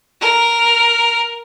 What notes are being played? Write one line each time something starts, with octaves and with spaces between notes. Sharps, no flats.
A#4